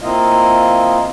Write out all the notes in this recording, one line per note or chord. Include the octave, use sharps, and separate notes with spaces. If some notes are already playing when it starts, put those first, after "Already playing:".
A#3 C4 E4 F4 D#5 F5